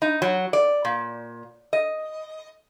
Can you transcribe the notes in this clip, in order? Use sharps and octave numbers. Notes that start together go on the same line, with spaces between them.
D#4
F#3
D5
A#2
D#5